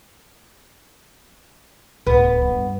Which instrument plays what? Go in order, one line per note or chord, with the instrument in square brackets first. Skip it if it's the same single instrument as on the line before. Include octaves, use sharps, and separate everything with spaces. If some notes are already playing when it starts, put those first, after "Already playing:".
[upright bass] D1 [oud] B3
[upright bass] G2